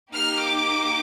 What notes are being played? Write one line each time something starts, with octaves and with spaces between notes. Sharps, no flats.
A#3 D#4 G4 F6
D6